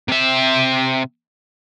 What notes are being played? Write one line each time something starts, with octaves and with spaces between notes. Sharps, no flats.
C3 E5